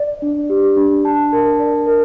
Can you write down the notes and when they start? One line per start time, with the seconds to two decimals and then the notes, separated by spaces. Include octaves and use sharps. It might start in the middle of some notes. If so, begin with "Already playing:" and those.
Already playing: D5
0.22 D4
0.50 G4
0.77 D4
1.05 A5
1.32 A#4
1.59 D5
1.87 A#4